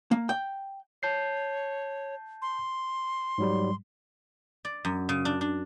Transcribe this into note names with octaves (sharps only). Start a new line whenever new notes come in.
A#3
G5
C#5 A5 G6 C7
C6
G#2 F#3 G3
D5
F#2
C#3
D4
D4